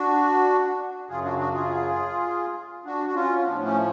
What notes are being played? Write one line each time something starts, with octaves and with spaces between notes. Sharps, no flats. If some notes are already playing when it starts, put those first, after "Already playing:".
Already playing: D4 F#4
F#2 C#3 F#3 F4 G#4
D4 F#4
D4 F#4
F4 G#4
D4 F#4
F#4
C#4 F4
C#4
A2 F3 B3 D4
A3 C#4